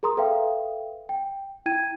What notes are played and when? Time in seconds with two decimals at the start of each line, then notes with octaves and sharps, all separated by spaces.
0.03 G#4 A#4 A#5 C6 D#6
0.17 A4 B4 E5 F5 G5
1.09 G5
1.66 E4 G5 G#6 D#7